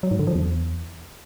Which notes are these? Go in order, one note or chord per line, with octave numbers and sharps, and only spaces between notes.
F#3
G#2
D3
F3
E2